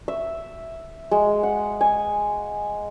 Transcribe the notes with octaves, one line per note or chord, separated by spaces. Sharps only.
E5
G#3
F#5
G#5